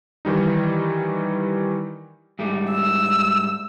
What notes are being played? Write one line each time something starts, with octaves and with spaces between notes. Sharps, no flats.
D#3 E3 G3 D#4
G#2 G3 A3
E6